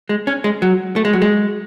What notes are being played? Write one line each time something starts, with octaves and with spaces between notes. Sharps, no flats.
G#3
C#4
G#3
F#3
A3
G#3
F#3
G#3